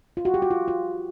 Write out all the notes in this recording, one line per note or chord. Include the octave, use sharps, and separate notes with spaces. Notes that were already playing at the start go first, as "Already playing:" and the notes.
F4
F#4
G4
F#4
F4
F4